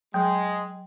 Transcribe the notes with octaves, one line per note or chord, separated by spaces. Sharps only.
F#3 G#3 G5